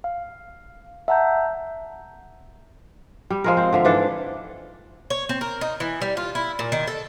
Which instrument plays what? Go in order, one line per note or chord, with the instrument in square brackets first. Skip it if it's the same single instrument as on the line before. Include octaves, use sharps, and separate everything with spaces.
[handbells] F5
E5 F#5 A5 A#5 G6
[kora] G3
F3 G#3 A#4
C4
D3 F3 E5
G#2 E3 D4 A4
[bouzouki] C#5
C4
A#4
D#4
E3
G3
F4
E4
A#2
D#3
A4